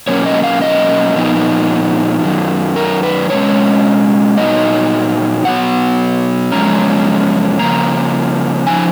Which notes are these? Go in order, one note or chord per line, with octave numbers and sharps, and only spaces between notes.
B2 F#3 A#3 C#4 C#5
D#5
F5
D#5
A#2 F3 B3 D#4
F#2 D#3 F#3
A#4
B4
B2 G#3 C#4 C#5
A#2 F#3 B3 D#4 D#5
B2 F#3 B3 F#5
F#2 C#3 F3 G#3 C#4 A#5
C#3 F3 A#3 A#5
C#3 F3 D#4 G#5